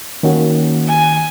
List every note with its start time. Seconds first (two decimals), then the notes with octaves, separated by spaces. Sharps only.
0.23 D#3 A#3 C#4 F#4
0.87 G#5